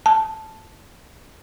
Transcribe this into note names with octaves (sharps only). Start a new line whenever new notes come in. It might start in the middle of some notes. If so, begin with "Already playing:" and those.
A5